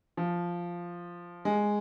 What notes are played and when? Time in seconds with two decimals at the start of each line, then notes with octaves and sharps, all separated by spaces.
0.17 F3
1.45 G#3